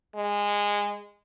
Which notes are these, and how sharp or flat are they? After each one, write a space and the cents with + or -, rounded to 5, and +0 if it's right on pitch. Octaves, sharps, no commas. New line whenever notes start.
G#3 -20